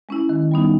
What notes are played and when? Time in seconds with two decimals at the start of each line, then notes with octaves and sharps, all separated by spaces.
0.09 G#3 C#4 E4
0.29 D#3
0.51 G3 B3 D#4